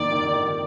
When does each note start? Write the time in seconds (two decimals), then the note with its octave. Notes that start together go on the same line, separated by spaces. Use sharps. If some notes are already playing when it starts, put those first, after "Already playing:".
Already playing: F2 D#3 A#3 D5
0.13 D#3
0.33 D#3